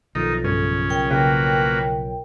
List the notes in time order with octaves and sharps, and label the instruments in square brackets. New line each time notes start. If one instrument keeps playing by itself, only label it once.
[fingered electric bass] B1 F3 [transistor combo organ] D#3 D#4 [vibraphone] A4
[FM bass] G2 [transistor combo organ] C#3 C#4
[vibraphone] A#4 C#5 G5
[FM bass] C#3 [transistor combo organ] A#3 F#4 B4